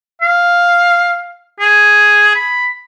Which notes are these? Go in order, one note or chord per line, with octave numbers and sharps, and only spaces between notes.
F5
G#4
B5